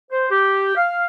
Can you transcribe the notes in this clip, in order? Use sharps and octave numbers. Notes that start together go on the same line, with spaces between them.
C5
G4
F5